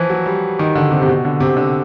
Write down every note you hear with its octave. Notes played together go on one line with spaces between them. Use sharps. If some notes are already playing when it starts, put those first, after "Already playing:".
Already playing: E3 F3
F#3
G3
D#3
D3
C3
C3
B2
D3
C3
D3